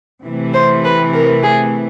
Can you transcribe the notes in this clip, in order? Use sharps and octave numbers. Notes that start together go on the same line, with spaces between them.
C3 E3 A3
C5
B4
A#4
G#4